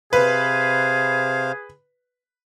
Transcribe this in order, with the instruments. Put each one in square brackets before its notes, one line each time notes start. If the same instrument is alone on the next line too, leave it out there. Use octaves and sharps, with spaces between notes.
[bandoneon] C3 C5 F5 [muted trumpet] G#4 [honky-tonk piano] B4